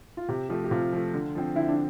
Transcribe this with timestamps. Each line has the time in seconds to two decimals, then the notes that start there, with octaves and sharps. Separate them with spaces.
0.17 F4
0.29 C3 G4
0.49 F3 A3 G4
0.64 G4
0.71 C3 F4
0.93 F3 A3
1.14 D3
1.35 F3 C4
1.56 D3 E4
1.68 D4